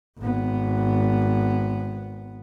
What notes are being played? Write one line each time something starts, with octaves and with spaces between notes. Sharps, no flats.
G#1 B3